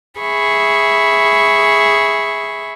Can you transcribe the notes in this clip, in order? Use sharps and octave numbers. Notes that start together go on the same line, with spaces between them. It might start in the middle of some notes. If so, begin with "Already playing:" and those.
G#4 E5 B5 C#6